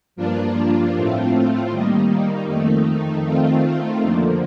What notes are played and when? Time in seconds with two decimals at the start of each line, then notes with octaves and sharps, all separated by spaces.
0.16 G2 F3 A#3 D4 F4
0.94 A2 A3 C4 F4
1.70 D#3 G3 A#3 D#4
2.48 F2 D#3 A3 D#4
3.25 D#3 A3 C4 F4
4.03 F2 D3 F3 A#3